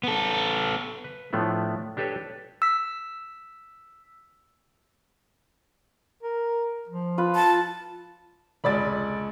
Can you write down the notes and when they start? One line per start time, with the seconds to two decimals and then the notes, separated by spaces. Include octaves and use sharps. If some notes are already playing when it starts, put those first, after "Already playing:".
0.03 B3 A4
1.04 B4
1.33 A2 F3 A3 B3 D4
1.97 D4 G4 A4 B4 C#5
2.62 E6 B6
6.23 A#4
6.89 F3
7.18 F4 B4
7.35 A5
8.64 F1 C#2 D5 B5 A6